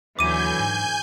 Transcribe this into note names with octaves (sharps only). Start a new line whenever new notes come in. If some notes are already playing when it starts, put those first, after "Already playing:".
D#2 D3 E3 F#3 G#5 D6 G6 D#7
G#2